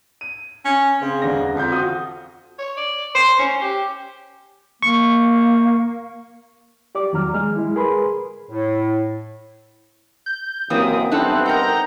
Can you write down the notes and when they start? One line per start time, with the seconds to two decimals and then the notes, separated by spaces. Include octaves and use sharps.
0.21 D#7
0.65 C#4
1.02 C#3 C4
1.22 E1 D3 A#6
1.55 F2 C4 G6
1.71 F4 F#4 D#6
2.59 C#5
2.77 D5
3.15 C5
3.39 C#4
3.62 G4
4.82 A#3 C#6
6.95 G4 D5 D6
7.13 E2 D#3 F#3 A#5 F6
7.34 G#3 F6
7.56 G#3 E4
7.76 G#4 A#4 B4 B5 C6
8.49 A2
10.26 G6
10.70 F#2 C3 E3 A#3 C4 D#6
11.12 G2 B3 C4 D#4 E4 A4 F#6
11.46 D#4 A#4 F#5 A#5 G6